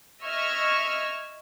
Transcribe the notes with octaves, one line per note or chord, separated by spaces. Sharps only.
D#5 E5 C#6 E6 F6 G#6